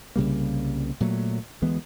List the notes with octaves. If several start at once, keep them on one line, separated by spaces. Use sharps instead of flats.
C2 C#3 G3 A#3
A#2 F#3 A3
D2 E3 G#3 B3